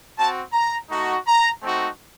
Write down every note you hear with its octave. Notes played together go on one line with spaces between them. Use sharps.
C4 F#4 A5
A#5
A3 D#4 F#4
A#5
A3 C4 D#4 F#4